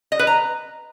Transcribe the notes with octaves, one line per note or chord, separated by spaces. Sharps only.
D#5
B4
A#5